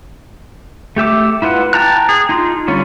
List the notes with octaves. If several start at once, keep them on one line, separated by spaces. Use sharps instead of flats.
A3 G4 E5 D6
E4 F4 B4 F#5
G5 A5 A#5 F#6
G#4
D#4 F4
D3 G3 C#4 F4